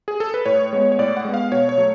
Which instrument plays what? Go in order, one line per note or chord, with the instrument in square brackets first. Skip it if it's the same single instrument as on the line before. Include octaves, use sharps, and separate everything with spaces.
[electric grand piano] G#4
A4
B4
A2 C#5
G#3 B3
C#5
A2 D5
F#5
G#3 B3
F5
B2 C#5
C#5
F#3 A3